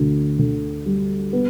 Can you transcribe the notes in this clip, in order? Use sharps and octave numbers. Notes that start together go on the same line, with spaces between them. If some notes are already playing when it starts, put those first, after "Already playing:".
Already playing: D2 D3
D3
G3
B3